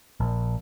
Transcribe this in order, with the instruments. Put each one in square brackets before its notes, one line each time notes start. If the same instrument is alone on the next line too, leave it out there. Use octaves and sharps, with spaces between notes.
[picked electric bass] A#1